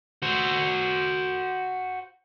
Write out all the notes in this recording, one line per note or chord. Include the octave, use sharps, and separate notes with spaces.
F#4 C5